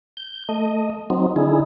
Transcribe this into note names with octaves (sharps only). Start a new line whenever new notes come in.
G6
A3 D#5
F#3 C4 D#4
D3 D#4 E4 G#4